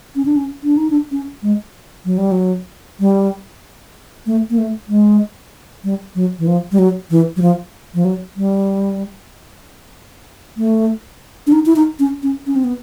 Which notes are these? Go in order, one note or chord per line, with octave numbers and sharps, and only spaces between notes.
C#4
D4
C#4
D4
D#4
D4
C#4
G#3
F#3
G3
F#3
G3
A3
A#3
A3
G#3
G3
F#3
E3
F3
G3
F#3
E3
F#3
F3
F3
F#3
G3
A3
D4
D#4
E4
D#4
C#4
C#4
C#4
C4
B3